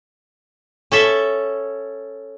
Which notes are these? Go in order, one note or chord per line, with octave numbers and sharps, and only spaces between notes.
C#4 A4 E5